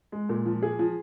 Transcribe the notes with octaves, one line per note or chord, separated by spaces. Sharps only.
G#3
A#2
F3
G#4
F3